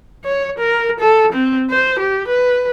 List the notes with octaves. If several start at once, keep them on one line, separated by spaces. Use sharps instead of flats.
C#5
A#4
A4
C4
C5
G4
B4